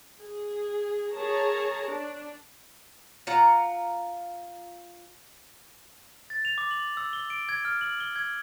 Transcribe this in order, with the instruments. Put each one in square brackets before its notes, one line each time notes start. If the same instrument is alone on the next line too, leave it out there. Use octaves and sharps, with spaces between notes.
[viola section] G#4
G#4 A#4 C#5 A5 A#5
D4
[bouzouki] F4 F#5 A#5
[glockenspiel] A6
F7
D6
F#7
E6
G7
D7
G#6
F6
F#7
G7
G#6